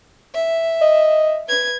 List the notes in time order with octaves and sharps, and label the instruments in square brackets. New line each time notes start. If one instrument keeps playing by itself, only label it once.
[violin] E5
[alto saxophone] D#5
[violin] B4 G#6